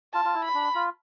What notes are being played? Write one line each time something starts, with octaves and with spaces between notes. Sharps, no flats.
F4 A5
F4
E4
B5
D4
F4